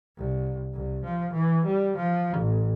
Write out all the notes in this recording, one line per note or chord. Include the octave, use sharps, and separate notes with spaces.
C2
C2
F3
E3
G3
F3
A1